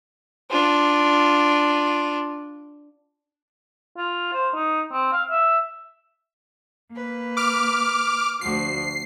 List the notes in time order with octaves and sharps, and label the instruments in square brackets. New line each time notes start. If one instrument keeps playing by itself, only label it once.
[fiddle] D4 F4
[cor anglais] F4
C5
D#4
C4
F5
E5
[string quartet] A#3 B4
[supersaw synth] D6 F6
[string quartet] D2 F3 F#4 [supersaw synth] C7